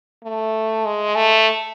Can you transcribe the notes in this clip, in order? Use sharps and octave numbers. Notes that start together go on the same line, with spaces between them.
A3
G#3
A3